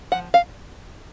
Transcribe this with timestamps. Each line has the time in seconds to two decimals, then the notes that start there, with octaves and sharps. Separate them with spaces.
0.12 F3 F#5
0.34 F5